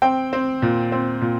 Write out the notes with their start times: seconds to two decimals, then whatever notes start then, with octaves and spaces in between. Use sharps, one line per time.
0.02 C4 G5
0.33 C4
0.62 A#2
0.92 C4
1.21 A#2